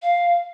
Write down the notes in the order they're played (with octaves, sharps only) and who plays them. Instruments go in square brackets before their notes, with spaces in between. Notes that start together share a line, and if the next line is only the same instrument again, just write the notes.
[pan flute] F5